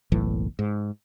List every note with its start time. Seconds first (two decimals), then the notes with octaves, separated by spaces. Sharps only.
0.12 F#1 B1 A2 E3
0.59 G#2